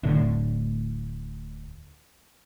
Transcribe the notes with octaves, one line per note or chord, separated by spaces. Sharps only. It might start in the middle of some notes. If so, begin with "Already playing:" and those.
D1 A2 D3